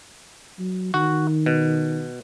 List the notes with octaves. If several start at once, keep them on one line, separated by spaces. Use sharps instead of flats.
F#3
D#3 F#4
B2